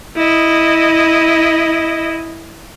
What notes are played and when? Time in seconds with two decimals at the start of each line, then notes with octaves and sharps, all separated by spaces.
0.16 E4 D#5